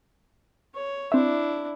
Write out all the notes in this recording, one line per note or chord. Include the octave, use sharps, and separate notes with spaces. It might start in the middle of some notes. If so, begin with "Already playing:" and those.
C#5
C4 D4 E4 E5